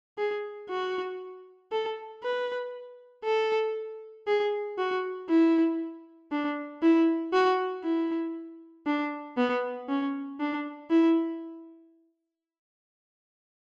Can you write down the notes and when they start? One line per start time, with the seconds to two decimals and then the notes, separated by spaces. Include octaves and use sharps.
0.18 G#4
0.69 F#4
1.72 A4
2.23 B4
3.24 A4
4.27 G#4
4.78 F#4
5.30 E4
6.32 D4
6.83 E4
7.33 F#4
7.84 E4
8.87 D4
9.37 B3
9.89 C#4
10.40 D4
10.90 E4